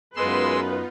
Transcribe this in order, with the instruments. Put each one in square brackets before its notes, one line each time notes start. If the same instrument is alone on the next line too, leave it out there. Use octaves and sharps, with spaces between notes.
[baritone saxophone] F#2 [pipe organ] G#3 C6 E6 [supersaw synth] B3 D#4 F4 [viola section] B4